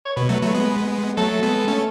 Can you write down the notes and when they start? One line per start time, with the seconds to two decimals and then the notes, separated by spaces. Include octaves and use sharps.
0.05 C#5
0.16 B2 B4
0.29 F#3 A3
0.42 F#3 A3
0.54 G#3 B3
1.17 F#3 A3 A4
1.43 G#3 B3
1.68 A3 C#4